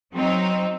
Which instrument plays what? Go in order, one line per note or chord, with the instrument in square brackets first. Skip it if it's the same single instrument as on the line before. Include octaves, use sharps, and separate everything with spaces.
[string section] F#3 C4 D#4